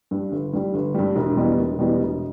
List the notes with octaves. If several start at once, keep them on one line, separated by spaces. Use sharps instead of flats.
G2 G3
G1
G2 G3
G1
G2 G3
E1
E2 B2 G3
E1
E2 B2 G3
E1